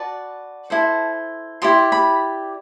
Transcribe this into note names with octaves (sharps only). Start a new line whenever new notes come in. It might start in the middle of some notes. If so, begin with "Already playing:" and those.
Already playing: F#4 B4 D5 A5
E4 A4 C5
E4 G4 D5 C6
B5